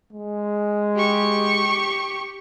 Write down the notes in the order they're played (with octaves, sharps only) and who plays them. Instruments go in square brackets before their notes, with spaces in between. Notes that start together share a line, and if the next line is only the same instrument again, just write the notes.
[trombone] G#3
[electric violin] G4 C#6